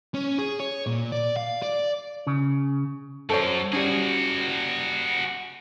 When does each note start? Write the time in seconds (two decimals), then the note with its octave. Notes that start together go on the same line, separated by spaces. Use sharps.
0.14 C#4
0.38 G#4
0.60 C#5
0.86 A#2
1.12 D5
1.37 F5
1.62 D5
2.27 C#3
3.30 F#2 A4 C5 C#5
3.73 G3 C#4 F#4 G#4